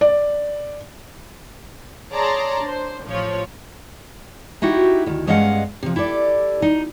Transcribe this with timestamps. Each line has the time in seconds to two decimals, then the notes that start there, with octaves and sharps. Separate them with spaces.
0.01 D5
2.13 G#4 C#5 D5 A5 A#5 C6
2.62 D4 C5
3.05 A1 F3 C#5
4.62 D#4 E4 F#4 G4
5.06 D2 D#3
5.27 G2 G#3 C#4 D#5 F5 F#5
5.83 C3 F3
5.96 E4 G4 A4 D5
6.62 D#4